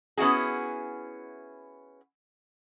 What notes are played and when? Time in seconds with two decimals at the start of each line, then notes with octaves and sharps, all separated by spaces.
0.17 B3 C#4 E4 F#4 G#4